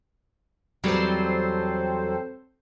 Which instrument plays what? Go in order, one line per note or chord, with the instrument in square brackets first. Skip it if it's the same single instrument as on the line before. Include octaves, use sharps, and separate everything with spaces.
[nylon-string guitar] E2 F#3 G3 [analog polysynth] C4 A4 C5